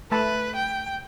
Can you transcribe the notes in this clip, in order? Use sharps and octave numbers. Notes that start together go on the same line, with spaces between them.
A3 B4 A5 B5
G5